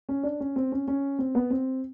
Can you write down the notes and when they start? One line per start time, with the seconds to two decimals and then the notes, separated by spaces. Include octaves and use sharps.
0.09 C#4
0.23 D4
0.40 C#4
0.56 C4
0.72 C#4
0.88 C#4
1.19 C4
1.35 B3
1.50 C4